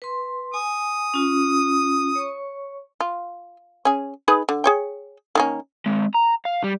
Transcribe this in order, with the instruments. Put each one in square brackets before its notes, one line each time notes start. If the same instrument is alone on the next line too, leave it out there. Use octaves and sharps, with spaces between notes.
[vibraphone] B4 C6
[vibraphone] G#5 [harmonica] D#6
[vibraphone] C#4 F4
C#5 C#6
[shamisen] F4
C#4 G#4
D#4 G#4 B4
D3
G#4 C#5 G5
D#3 A#3 C#4
[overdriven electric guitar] G#3 C4
A#5
F5
G3